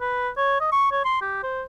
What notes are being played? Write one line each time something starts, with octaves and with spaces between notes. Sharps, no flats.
B4
C#5
D#5
C#6
C#5
C6
G4
C5